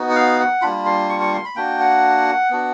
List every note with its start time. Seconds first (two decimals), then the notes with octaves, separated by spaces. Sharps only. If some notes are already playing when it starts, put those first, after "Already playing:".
Already playing: B3 D#4 F#4
0.10 F#5
0.16 F5
0.39 F#5
0.62 G3 A#3 D4 F4 B5
0.86 C6
1.09 C#6
1.21 C#6
1.33 C6
1.45 B5
1.56 A#3 D4 F#4 G5
1.80 F#5
2.50 B3 D4 F#4